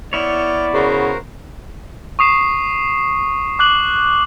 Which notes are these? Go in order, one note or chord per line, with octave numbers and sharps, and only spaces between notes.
B3 E4 C#5 D5 F6 G6
C#3 F#4 A#4 C5
C#6 D#6 C7 E7
D6 F#6 F#7